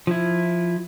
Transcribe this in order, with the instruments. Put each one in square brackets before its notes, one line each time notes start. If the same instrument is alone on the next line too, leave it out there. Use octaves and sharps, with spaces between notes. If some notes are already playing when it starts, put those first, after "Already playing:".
[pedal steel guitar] F3 E4